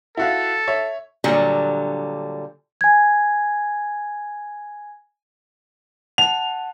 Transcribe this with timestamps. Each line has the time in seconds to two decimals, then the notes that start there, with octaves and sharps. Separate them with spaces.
0.17 E4 F#4 A4 F5
0.68 C#5 E5
1.24 A#2 D3 F#3 G3
2.81 G#5 G#6
6.18 F#5 A5 F7